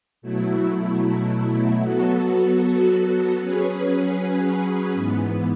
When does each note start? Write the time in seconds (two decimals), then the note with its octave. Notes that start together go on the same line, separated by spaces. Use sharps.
0.22 B2 F#3 A3 E4
1.79 F#3 B3 F#4 A4
3.37 F#3 C#4 G#4 B4
4.94 G#2 E3 B3